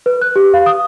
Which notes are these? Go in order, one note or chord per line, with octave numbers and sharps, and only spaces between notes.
B4
F#6
G4
F5
D#6